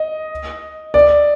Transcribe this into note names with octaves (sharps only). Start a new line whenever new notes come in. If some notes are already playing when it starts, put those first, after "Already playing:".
Already playing: D#5
D5